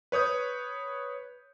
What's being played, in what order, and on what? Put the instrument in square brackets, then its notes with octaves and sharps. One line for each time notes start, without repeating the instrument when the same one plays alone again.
[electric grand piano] B4 C#5 D#6 G6